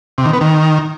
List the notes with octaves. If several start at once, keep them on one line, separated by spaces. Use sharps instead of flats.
C3
D#3
B3
D#3